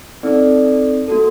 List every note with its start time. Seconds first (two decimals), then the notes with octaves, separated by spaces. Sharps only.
0.23 C4 D#4 A4 D5
1.08 A#3 F#4 A4